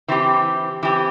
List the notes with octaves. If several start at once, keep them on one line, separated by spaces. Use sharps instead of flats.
E3 C4 G4
E3 C4 G4